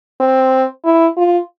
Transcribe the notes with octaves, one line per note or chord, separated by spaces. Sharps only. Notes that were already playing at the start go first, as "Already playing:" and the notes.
C4
E4
F4